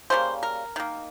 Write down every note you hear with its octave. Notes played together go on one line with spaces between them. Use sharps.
C#3 G3 A#3 C5
A#4
D#3 A#3